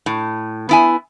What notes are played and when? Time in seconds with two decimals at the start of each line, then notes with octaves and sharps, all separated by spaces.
0.06 A2
0.69 B3 E4 G#5